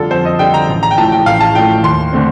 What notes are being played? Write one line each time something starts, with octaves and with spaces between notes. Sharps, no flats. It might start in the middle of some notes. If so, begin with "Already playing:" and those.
Already playing: F2 D3 G3 F4 A4
F2 C5
D#5
D3 G3 G5
A#5
A1
A#5
G5
A2 F3 A3 A5
G5
A1 F5
A5
A2 F3 A3 G5
D#2 C6
D3 A3 C4